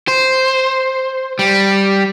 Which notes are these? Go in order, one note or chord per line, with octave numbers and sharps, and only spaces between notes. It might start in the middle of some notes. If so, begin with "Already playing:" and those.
C5
G3